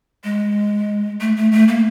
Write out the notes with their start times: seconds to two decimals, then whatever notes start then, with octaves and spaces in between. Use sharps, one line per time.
0.24 G#3
1.21 A3
1.37 A3
1.52 A3
1.68 A#3